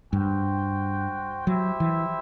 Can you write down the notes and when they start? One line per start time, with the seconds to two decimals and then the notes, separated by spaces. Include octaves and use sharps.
0.13 G2 F#4 C5 G5
1.47 F#3 E4 G4 C5 E5
1.80 E3